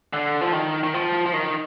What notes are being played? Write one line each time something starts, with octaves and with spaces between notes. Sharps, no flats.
D3
F3
D#3
D#3
F3
F3
D#3